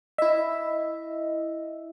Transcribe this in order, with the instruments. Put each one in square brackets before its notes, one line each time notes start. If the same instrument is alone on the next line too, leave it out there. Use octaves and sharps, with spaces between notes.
[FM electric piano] E4 E5 [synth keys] D#5